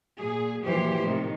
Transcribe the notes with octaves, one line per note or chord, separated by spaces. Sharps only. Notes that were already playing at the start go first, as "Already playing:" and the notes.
A#2 G#4
F#2 A#2 E3 F3 G4 C5
A2 C3 D#3